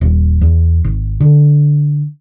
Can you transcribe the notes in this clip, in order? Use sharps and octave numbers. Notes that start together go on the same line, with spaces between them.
D#1
E2
G#1
D3